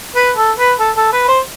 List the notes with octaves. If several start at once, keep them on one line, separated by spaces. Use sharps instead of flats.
B4
A4
B4
A4
A4
B4
C5